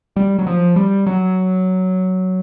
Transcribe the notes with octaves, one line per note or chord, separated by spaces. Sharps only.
G3
F#3
F3
G3
F#3